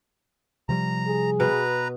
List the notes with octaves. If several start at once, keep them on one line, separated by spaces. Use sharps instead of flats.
C3 F3 G3 A#5
G#4
B2 B4 A#5